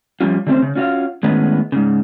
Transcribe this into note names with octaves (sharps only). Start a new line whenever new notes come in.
F3 G3 C#4 F4
D3 F#3 A3 C4 C#4 C5
C#3
C#4 F4 F#4 C5 F5
A2 D#3 G#3 B3 C#4
G#2 C#3